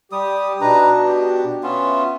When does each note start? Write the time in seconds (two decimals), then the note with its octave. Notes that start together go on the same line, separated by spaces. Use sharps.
0.12 G3 G4 D#6
0.61 B2 D4 D#4 B4 A#5
1.08 G4
1.63 B3 C#4 F4 E5